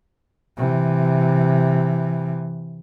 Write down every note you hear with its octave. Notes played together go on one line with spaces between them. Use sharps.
C3 E3